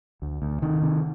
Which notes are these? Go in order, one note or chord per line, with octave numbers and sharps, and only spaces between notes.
D2
D2
C3 D#3
C3